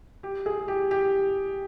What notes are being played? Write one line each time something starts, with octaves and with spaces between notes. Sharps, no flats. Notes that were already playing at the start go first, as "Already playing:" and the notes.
G4
G#4
G4
G4